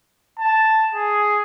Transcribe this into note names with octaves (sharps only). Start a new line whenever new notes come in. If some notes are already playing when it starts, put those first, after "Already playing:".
A5
G#4